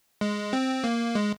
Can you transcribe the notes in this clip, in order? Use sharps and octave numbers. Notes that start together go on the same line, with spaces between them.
G#3
C4
A#3
G#3